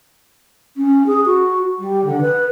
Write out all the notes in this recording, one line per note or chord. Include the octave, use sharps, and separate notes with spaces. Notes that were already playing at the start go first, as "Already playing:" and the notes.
C#4
G#4
F#4
G3
D3
B4